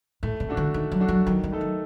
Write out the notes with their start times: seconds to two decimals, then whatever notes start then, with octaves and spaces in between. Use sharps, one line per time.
0.23 A2 A3
0.40 C3
0.49 D4 F#4 A4
0.57 D3
0.74 D#3 A3
0.92 F#3
1.00 D4 F#4 A4
1.08 F#3
1.26 D#3 F#3
1.44 G3
1.52 A3 D#4 A4
1.61 F#3